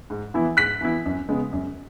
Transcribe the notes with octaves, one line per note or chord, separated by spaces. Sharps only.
G#2
E3 B3 E4
G#2 F#6 B6
E3 B3 E4
F#2
C#3 G#3 B3
F#2